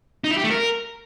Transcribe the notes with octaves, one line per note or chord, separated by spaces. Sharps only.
D#4
E4
G4
A3
A#4